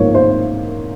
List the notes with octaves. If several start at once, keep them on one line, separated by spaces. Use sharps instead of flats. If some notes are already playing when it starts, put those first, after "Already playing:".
Already playing: G#2 F3 A#3 D#4 C#5
C5